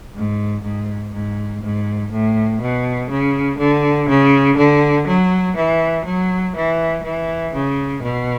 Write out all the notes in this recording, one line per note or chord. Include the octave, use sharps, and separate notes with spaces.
G#2
G#2
G#2
G#2
A2
B2
C#3
D3
C#3
D3
F#3
E3
F#3
E3
E3
C#3
B2